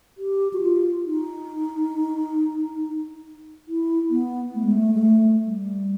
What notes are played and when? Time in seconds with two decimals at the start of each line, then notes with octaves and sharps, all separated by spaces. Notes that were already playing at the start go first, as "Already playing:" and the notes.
0.18 G4
0.53 F#4
0.62 F4
1.06 D#4
3.68 E4
4.11 B3
4.55 A3
4.63 G#3
4.71 A3
4.94 G#3
4.98 A3
5.43 G3